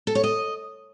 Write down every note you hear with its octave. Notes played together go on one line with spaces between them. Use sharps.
A4
C#5
D#5